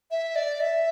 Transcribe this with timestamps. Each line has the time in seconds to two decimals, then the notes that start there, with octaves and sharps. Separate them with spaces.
0.11 E5
0.36 D5
0.60 E5